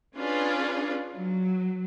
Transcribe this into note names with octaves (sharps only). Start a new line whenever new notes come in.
C#4 D4 F4 G#4 B4
F#3